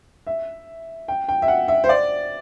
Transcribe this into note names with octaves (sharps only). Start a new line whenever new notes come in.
E5
G5
G5
E5
F#5
E5
C5
D5